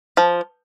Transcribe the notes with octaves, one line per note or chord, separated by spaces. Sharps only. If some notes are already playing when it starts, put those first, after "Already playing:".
F3